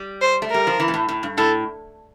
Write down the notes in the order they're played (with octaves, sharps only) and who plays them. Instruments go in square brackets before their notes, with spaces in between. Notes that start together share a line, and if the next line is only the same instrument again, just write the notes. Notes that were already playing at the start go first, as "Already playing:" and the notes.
Already playing: [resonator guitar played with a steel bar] G3
[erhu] C5
[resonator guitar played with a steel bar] A3
[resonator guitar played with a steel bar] G3 [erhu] A#4
[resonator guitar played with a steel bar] F3
E3
A#2
A2
A2
G2
[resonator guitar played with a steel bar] A2 [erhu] A4